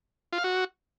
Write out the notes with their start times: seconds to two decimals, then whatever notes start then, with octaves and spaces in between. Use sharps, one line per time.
0.33 F4
0.38 F5
0.44 F#4